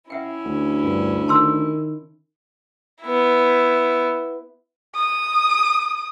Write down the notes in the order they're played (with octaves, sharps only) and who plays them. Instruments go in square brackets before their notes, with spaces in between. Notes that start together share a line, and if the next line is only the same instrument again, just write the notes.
[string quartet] C#4 E4 [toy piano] E5 F#5 G5
[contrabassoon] D2
[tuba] G2
[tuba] D#3 [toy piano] A5 C6 E6
[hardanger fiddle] B3 E4
[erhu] D#6